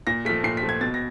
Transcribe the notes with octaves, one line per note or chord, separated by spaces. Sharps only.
A#2 A#6
F3 A3 B6
A#2 C7
B6
F3 A3
G#6
B2 A6
A#6